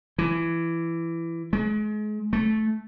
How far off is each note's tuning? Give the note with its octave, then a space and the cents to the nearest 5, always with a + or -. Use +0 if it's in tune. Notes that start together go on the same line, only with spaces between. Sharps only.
E3 +15
G#3 +35
A3 -15